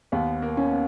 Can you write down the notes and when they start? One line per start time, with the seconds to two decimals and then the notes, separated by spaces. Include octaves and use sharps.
0.12 D#2 B3
0.42 A#3
0.57 C#4
0.72 B3